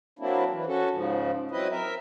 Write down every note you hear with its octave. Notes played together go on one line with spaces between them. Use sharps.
F#3 A#3 C4 D4 E4
E3
C#4 F#4 A4
G#2 C#3 F3
F#3 C4 E4 B4 D#5
A#4 E5